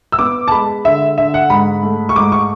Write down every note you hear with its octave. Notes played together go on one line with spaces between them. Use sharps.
E6
B3 D6
A5
G#3 B5
D3 E5
D3 E5
F#5
G#2 B5
A3
C#6
G#2 D6
C#6